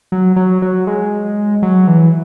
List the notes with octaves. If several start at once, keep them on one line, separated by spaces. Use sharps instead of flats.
F#3
F#3
F#3
G#3
F#3
E3